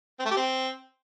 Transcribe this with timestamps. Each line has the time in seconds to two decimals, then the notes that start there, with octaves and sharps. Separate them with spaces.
0.20 C4
0.25 A3
0.31 G4
0.37 C4